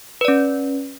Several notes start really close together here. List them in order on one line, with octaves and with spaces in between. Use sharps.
B4 D5 C#4